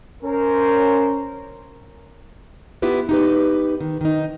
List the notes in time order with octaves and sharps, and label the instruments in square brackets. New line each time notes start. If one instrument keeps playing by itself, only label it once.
[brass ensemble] C#4 A#4 C5
[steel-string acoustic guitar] B3 E4 F4 G4 B4
D#4 G4 B4
D#3
D#3 D#4